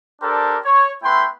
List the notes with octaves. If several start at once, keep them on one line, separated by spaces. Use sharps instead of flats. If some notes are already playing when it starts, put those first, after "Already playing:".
D4 G4 A4 A#4 C5 D5
C#5
A3 B3 E4 B4 G5 C6